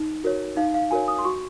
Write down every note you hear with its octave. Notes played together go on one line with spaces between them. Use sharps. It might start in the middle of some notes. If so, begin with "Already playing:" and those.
Already playing: D#4
F#4 A#4 C#5
D#4 F5
F5
F#4 A#4 C#5 G#5
D#6
C6
F#4 C#6